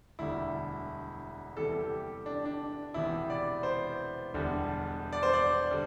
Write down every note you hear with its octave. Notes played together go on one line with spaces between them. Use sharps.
E1 D2 D3 G3 E4
E2 C3 E3 G3 A4
A4
G4
D4
D4
E1 E2 C3 E3 E4
D5
C5
E1 E2 D3 G3
D5
C5
D5
D3 G3